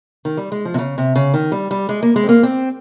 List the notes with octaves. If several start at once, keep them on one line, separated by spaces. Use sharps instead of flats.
D#3
G3
G#3
F3
C3
C#3
C3
C#3
D#3
G3
G3
G#3
A#3
G#3
C4
A#3
C4